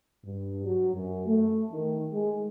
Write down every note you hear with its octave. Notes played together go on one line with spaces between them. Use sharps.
G2
F#3
F#2
A3
D#3
G#3